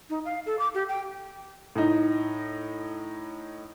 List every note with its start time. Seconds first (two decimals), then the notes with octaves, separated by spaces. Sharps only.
0.10 D#4
0.25 F5
0.46 A4
0.59 D6
0.74 G4
0.88 G5
1.76 A2 D#4